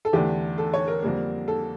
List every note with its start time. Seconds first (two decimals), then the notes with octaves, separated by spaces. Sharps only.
0.05 A4
0.13 E2 D3 A3 G4
0.58 A4
0.74 C#5
0.88 A#4
1.02 F2 D3 G3 A#3
1.48 A4